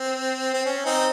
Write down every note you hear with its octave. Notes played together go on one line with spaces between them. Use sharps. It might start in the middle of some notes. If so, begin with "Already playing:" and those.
Already playing: C4
C4
C#4
C4 D#4